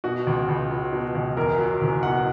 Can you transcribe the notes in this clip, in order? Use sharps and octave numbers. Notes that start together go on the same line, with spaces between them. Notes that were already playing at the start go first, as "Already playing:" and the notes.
B2 F#4
C#2
C#2
F#3
B2
C#2
E2 A#4
F#3
F#1
B2 F#5